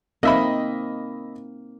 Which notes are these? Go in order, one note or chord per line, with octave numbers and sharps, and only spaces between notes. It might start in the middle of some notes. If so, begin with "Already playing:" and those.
A#3 C4 D#4 D#5 E5 B5